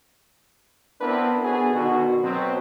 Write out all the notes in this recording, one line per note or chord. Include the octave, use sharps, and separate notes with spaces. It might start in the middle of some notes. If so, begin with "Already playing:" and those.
B3 C4 D4 E4 A#4 B4
B3 D4 F#4 G#4 A4
B2 D3 D#3 F#4
B2 F#3 C4